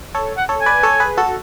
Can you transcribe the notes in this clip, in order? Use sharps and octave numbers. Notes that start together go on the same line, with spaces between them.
A4 C#5
F#5
A4 C#5
G#5
B4 D5
A4 C#5
G#4 B4
F#4 A4